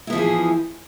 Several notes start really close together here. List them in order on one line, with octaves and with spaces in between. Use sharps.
E4 B3 F3 E3 G#4